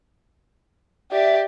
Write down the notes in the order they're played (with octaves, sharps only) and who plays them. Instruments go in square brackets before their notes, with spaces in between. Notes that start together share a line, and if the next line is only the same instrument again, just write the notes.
[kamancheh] G4 D5 [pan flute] E5